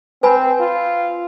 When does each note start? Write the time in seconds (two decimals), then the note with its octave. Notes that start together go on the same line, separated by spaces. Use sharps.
0.23 C4 B4 G#5 B5
0.60 F4